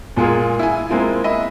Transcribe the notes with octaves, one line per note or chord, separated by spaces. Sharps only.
A#2 G#3 A#3 F4 G#4
E4 G#5
G#3 A#3 C4 E4 F4
D#5 E5 B5